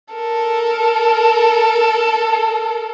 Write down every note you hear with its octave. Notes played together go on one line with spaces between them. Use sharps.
A4 A#4